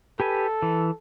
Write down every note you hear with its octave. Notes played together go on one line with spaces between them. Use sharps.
G4 A4 B4 G#5
E3